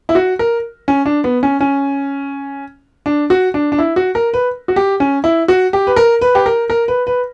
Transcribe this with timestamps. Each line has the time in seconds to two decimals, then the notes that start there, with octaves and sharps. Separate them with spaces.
0.09 E4
0.15 F#4
0.39 A#4
0.88 C#4
1.06 D4
1.24 B3
1.43 C#4
1.61 C#4
3.06 D4
3.30 F#4
3.54 D4
3.72 D4
3.78 E4
3.96 F#4
4.15 A#4
4.34 B4
4.68 F#4
4.76 G4
5.00 C#4
5.24 E4
5.48 F#4
5.73 G4
5.87 B4
5.96 A#4
6.21 B4
6.35 G4
6.46 A#4
6.70 A#4
6.88 B4
7.07 B4